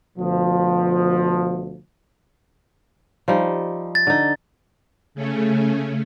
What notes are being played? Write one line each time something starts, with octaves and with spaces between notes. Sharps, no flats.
D2 B2 F3
F3 G3 D#4
A6
D3 D#4
C#3 A3 C#4